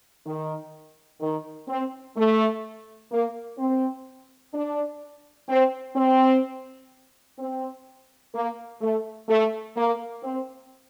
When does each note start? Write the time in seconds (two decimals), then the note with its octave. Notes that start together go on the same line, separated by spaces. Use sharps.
0.26 D#3
1.21 D#3
1.68 C4
2.17 A3
3.12 A#3
3.58 C4
4.54 D4
5.49 C4
5.96 C4
7.39 C4
8.34 A#3
8.81 A3
9.29 A3
9.77 A#3
10.23 C4